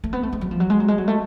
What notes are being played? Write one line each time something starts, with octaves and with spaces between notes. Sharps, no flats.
A3
B3
A3
G#3
F#3
F3
F#3
G#3
F#3
G#3
F#3
A3